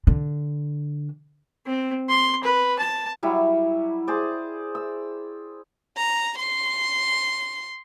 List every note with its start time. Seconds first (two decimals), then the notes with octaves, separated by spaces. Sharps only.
0.07 D3
1.66 C4
2.09 C6
2.43 B4
2.79 A5
3.23 F#3 G3 E4
4.08 G#4 C5 D5
4.75 E6
5.97 A#5
6.38 C6